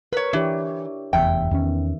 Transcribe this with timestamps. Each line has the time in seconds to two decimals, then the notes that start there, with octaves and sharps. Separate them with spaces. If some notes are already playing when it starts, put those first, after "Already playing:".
0.13 A#4 B4 C#5
0.33 E3 D4 G4 C#5
1.13 F1 E2 E5 G5
1.51 E2 D#3 B3 C#4